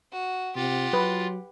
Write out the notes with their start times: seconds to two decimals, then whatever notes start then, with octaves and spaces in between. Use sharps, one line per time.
0.12 F#4
0.56 C3 F4 G4 F#5
0.93 F#3 B4